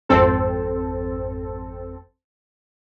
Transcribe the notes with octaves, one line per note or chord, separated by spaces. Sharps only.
G#1 F2 C4 A4